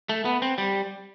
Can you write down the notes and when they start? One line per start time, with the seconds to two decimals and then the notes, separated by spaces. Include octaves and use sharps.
0.09 A3
0.25 B3
0.42 C4
0.58 G3